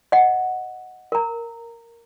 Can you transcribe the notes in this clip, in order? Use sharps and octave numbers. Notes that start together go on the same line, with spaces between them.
D#5 F#5
A#4 A#5